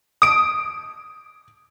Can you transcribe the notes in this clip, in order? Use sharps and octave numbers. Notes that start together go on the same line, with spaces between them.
D#6 D7